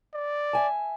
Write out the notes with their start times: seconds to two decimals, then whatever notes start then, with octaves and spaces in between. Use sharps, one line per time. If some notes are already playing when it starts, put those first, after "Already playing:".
0.14 D5
0.53 E5 G#5 A5